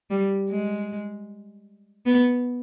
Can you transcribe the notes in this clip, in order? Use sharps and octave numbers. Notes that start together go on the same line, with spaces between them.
G3
G#3
B3